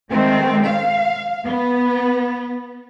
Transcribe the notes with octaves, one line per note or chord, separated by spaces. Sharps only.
D#3 G#3 A3 C4
F5
B3